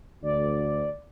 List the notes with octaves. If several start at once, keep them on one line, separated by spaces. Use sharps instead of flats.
D2 D5